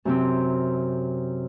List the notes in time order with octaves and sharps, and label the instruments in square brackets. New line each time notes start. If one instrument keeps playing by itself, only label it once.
[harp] F#2 C3 C4